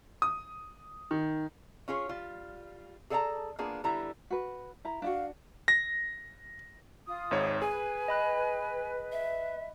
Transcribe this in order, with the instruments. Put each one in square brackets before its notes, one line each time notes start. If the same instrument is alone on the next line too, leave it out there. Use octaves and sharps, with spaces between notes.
[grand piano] D#6
D#3
[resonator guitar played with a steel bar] C#4 F4 G#4 C#5
G3 F4
G#4 A4 D5 F#5 A5 A#5
A#3 B3 D4 F4 G#4
D3 G3 B3 E4 A#5
[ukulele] F#4 B4
E4 A#5
[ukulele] D4 E4 F#4 [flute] F5
[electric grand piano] A#6
[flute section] F4 D#6
[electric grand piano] G#1 G#2 C#5
[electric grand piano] G#4 [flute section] B4 [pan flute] G#5
[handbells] D#5 B5 F#6
[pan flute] E5